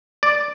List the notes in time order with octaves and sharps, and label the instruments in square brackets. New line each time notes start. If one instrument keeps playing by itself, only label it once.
[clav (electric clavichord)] D5